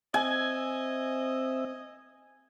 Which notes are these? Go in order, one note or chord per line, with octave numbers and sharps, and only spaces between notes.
C4 D#5 E5 G#5